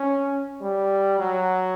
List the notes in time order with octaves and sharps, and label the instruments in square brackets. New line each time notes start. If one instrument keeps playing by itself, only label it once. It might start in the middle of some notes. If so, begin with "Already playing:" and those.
Already playing: [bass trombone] C#4
G3
F#3